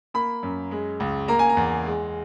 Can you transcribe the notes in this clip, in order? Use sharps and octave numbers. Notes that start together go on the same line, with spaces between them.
A#3 B5
F#2
G#3
C#2
A#3 A#5
G#5
A#5
E2
G#3